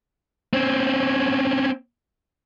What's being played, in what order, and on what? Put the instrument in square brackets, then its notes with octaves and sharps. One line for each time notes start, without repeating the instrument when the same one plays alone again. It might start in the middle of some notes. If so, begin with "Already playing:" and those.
[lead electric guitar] C4 C#4